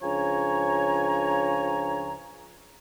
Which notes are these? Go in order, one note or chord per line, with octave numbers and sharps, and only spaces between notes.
C#2 F3 D4 C#5 G#5 A#5